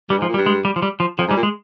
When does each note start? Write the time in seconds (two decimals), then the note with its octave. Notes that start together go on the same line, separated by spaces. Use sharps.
0.10 G2 G3
0.19 G#2
0.22 F3
0.28 A#2
0.34 G3
0.38 G2
0.46 G#3
0.65 G3
0.76 F3
0.82 G3
1.00 F3
1.18 F2 F3
1.28 G#2
1.31 G3
1.37 A#2
1.43 G#3